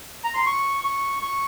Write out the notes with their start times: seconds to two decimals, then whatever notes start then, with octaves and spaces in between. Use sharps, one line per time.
0.24 A#5
0.34 C6
0.46 C#6
0.84 C#6
1.23 C#6